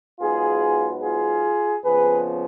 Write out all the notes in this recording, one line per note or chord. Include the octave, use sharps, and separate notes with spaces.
G#2 F#3 B3 F4 G#4
F4 G#4
F2 C#3 F3 B3 G#4 B4